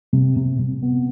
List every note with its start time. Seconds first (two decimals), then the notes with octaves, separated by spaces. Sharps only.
0.13 C3
0.36 C3
0.59 C3
0.82 B3